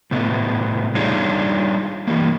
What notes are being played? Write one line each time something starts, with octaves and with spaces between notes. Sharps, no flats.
A2 C3 A3 B3
G3 D4 D#4 F4 G#4 C#5
E3 F3 G3 A#3